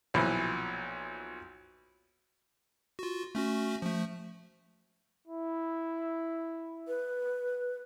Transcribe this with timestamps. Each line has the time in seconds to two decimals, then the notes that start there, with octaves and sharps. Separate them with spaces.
0.14 B1 A#2 E3 F3
2.99 F4 F#4
3.35 A3 C#4 F#4
3.82 F3 A3
5.28 E4
6.88 B4